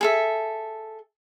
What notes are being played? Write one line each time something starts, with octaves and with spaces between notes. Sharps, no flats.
G#4 A4 E5